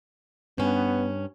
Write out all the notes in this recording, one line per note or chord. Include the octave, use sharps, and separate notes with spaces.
G2 B3 C#4